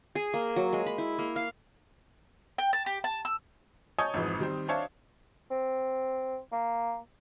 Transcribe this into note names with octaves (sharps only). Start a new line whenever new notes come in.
G#4
A#3
F#3
G#3
B5
E4
A#3
F5
G5
A5
G4
A5
E6
C#5 D#5 G#5 A5 D#6 G6
G#1 F2 G#2 E3
D#3 G3 C4
D4 C5 C#5 E5 F5 A5
C4
A#3